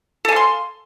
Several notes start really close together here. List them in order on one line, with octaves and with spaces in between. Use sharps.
A4 G#5 F5 C6